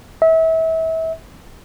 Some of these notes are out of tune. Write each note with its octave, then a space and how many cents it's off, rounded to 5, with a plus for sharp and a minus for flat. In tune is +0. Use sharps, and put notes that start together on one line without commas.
E5 -30